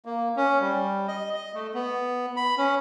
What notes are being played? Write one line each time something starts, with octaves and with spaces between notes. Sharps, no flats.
A#3
C#4
G3
D#5
D#5
A3
B3
B5
C#4